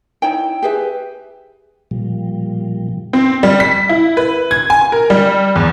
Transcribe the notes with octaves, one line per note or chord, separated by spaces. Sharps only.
D#4 E4 C#5 G5
G4 G#4 B4 E5
A#2 F3 G3
C4
G3
B6
E4
B4
G#6
G#5
A#4
G3
E2